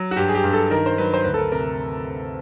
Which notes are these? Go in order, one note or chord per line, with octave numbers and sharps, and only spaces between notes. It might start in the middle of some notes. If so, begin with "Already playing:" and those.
Already playing: F#3
F#4
G2 G4
G#4
G4
G2
A4
D#3 A#4
C5
F#3 B4
C5
D2 B4
A4
A#4
C3 A#4